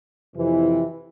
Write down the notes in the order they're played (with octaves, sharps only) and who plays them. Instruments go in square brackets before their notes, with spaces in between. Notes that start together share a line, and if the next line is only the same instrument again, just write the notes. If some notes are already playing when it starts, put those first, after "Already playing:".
[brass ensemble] F2 C3 E3